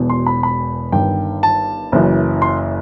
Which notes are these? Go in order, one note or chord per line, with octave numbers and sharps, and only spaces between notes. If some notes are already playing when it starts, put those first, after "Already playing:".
Already playing: E1 E2 B2
C6
B5
B5
G1 G2 D#3 G5
A5
F#1 F#2 E3
C6